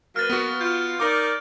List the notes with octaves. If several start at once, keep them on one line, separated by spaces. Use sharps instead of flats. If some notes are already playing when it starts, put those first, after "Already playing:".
F#3 A#3 B4 F6 A6
B3 F#4
F4 G6
D#4 A#4 D5 D6